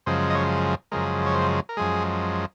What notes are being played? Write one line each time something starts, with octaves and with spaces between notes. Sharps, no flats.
F#2 C#3 F3 G#3 C5
D#5
C#5
F#2 C#3 F3 G#3 A#4
C#5
C5
A#4
F#2 F3 G#3 G#4